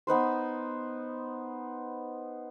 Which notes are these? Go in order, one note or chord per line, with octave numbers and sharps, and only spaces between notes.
B3 D#4 B4 C5